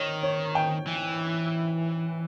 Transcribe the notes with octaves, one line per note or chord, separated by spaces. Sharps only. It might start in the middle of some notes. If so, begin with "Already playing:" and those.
Already playing: D#3 C#5
C#5
G5
E3